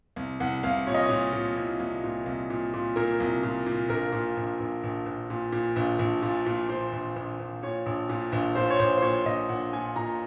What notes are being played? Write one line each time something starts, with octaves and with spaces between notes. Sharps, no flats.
C2
C2 F#5
C2 F5
A#2 C#5
D#5
C#5
A#2
A#2
C2
C2
A#2
C2
A#2
A#2
A#2 A#4
C2
A#2
A#2
A#1 A#4
A#2
A#1
A#1
A#1
A#1
A#2
A#2
A#1
A#1
A#2
A#2
A#2 C5
A#1
A#1
A#1
A#2 C#5
A#1
A#2
A#1
A#2 C5
C#5
A#1 C5
C5
A#2 C#5
A#1 D#5
A#1 F#5
A#2 G#5
A#2 A#5